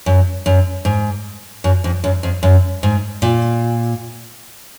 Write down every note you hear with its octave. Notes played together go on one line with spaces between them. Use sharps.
F#2
F#2
G#2
F#2
F2
F#2
F2
F#2
G#2
A#2